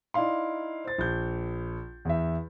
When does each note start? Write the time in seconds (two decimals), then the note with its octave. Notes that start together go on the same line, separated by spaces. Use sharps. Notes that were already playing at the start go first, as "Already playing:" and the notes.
0.14 D#4 E4 D5 F5 C6
0.85 C5 A6
0.98 A#1 G6
2.05 E2 E5